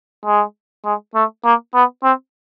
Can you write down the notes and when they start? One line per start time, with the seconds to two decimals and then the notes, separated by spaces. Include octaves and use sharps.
0.25 G#3
0.85 G#3
1.15 A3
1.45 A#3
1.74 B3
2.03 C4